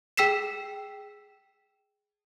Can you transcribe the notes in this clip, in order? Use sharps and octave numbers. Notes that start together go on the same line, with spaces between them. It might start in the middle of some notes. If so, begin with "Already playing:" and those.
G#4 G5 E6 B6 C7 E7